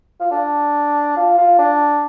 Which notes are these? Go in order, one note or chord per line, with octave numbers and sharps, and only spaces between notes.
F4
D4
F4
F4
D4